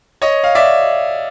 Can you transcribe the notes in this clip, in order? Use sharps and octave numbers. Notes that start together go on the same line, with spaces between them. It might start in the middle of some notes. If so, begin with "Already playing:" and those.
C#5 D#5
F5
D5 E5